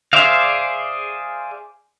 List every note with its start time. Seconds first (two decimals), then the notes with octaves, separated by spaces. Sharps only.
0.13 G#4 C5 D5 E5 F5